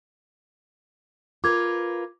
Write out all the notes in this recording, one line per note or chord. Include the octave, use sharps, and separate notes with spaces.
F4 A#4 B4 D6 G#6